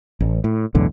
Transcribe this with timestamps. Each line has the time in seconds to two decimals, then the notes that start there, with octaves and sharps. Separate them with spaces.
0.20 A1
0.44 A2
0.75 B1 E2 A2 D3